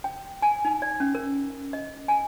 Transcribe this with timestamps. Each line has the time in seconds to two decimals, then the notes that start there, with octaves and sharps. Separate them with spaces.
0.04 G5
0.42 G#5
0.65 D#4
0.82 D5
1.00 C#4
1.15 A#4
1.73 D#5
2.08 G#5